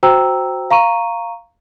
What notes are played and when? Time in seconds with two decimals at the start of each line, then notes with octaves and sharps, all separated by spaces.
0.03 F#4 C5 G5 A#5 E6
0.71 F5 A#5 C#6 D#7